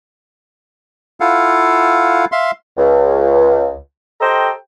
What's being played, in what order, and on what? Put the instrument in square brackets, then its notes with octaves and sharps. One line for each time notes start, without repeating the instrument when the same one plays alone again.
[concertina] E4 F4 A4 F5 F#5
E5 F5 C6
[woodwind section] C#2
G4 A4 C5 D#5 G5 A#5